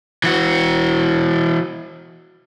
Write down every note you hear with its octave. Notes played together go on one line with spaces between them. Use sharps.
E3 F#4